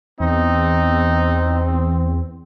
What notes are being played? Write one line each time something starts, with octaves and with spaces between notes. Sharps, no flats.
E2 C4 D#4